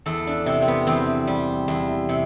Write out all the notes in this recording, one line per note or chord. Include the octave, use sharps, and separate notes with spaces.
E2 A4
D4
C3
C4
B3
E2 C4
G3
E2
C3